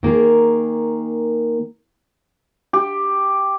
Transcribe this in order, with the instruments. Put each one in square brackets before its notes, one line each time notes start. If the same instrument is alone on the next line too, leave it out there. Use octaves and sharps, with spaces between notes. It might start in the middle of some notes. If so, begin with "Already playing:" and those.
[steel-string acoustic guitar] D#3 A#3 G#4 A#4
[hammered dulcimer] G4